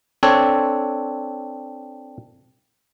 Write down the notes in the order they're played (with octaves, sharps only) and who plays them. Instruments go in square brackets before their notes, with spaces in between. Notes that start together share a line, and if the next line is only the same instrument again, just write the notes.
[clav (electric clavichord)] C4 D4 A4 C#5